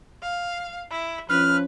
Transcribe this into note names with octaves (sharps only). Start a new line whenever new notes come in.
F5
E4
F3 C#4 B4 F6